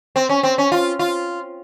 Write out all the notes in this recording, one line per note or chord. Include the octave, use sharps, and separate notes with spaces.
C4
C#4
C4
C#4
F4
F4